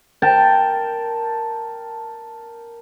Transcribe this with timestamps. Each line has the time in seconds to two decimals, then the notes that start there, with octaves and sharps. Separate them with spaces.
0.22 A#4 G5 A5